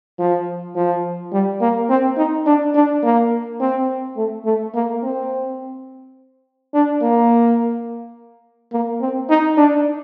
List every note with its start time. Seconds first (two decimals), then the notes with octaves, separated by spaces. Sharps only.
0.19 F3
0.75 F3
1.33 G3
1.61 A#3
1.89 C4
2.17 D#4
2.46 D4
2.75 D4
3.03 A#3
3.60 C4
4.17 A3
4.45 A3
4.75 A#3
5.03 C4
6.74 D4
7.02 A#3
8.73 A#3
9.01 C4
9.30 D#4
9.57 D4